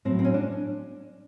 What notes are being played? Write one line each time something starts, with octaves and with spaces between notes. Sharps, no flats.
A2 F#3 C4
C4
C#4
D4